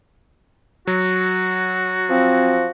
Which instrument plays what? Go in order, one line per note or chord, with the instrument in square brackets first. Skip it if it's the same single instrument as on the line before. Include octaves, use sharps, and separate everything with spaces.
[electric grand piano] F#3 [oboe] F#4
[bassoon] F3 [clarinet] C4